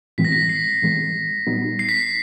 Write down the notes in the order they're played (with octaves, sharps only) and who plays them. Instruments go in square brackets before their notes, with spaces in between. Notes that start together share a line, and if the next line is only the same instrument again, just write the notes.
[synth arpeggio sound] A2 E3 G#3 C4 [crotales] B6
[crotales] A#6
B6
C7
[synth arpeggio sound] A2 E3 G#3 C4
A#2 G3 B3 D#4
[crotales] C7
B6
C7